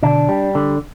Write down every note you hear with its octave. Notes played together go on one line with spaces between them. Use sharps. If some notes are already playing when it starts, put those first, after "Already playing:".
B2 D3 D4
G3
D3